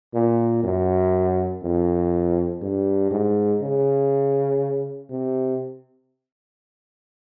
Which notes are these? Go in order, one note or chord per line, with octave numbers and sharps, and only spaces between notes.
A#2
F#2
F2
G2
G#2
C#3
C3